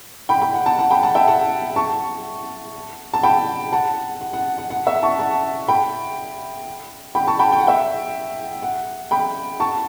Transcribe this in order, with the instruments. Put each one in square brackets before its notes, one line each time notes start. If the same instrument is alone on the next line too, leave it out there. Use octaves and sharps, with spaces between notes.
[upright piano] G5 B5
G5 B5
F#5
F#5 A5
F#5 A5
G5 B5
F#5 A5
E5 G5
F#5 A5
A5 C#6
A5
G5 B5
F#5 A5
F#5
F#5
F#5
F#5
E5
A5 C#6
F#5 A5
G5 B5
G5 B5
A5 C#6
G5 B5
G5
F#5
E5 G5
F#5
G5 B5
A5 C#6